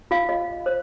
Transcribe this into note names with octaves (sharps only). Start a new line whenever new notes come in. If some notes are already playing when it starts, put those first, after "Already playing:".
F4 F5
F4 D#5
C5